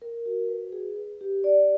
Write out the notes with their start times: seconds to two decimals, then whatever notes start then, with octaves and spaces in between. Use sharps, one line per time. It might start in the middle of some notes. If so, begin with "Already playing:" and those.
0.02 A#4
0.26 F#4
0.49 B4
0.72 G#4
0.96 B4
1.21 G4
1.44 D5